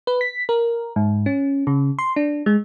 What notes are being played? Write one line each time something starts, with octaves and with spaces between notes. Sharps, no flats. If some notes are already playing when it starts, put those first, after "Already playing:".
B4
B6
A#4
G#2
C#4
C#3
C6
D4
G#3